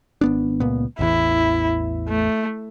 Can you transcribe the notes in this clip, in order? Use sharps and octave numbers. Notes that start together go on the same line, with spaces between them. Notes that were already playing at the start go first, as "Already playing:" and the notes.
G#1 B3 D4
C#2 A#2 B3
A1 E2 E3 E4
A3